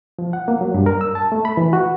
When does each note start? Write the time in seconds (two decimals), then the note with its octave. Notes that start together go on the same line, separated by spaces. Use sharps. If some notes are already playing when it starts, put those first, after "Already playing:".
0.19 F3
0.33 F#5
0.48 A#3
0.61 F#3
0.74 G2
0.86 A#4
1.01 E6
1.15 A5
1.32 A3
1.45 B5
1.57 E3
1.73 F#4